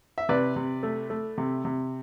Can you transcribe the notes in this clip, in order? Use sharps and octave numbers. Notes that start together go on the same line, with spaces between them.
E5
C3 B4 D5
C3
A3
A3
C3
C3